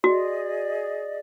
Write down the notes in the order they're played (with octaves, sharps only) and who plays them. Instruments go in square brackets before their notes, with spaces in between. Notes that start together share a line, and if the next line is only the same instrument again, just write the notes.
[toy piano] F#4 [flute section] G#4 D5 D#5